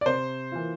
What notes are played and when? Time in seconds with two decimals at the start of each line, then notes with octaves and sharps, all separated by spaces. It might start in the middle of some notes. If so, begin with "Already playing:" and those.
0.01 D5
0.06 C3 C5
0.52 E3 A#3 F4